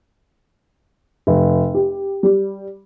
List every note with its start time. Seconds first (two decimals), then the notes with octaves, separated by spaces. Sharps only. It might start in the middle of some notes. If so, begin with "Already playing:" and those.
1.27 F1
1.74 G4
2.23 G3